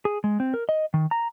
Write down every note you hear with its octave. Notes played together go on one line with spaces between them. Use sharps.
G#4
G#3
C4
A#4
D#5
D#3
A#5